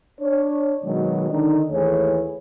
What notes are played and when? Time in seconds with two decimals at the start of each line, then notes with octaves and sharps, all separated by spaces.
0.20 D4 C#5
0.84 B2 D#3 F#3 G#3
1.30 D3 D#3 D4 D#4
1.71 D#2 E3 A3 G#4 C#5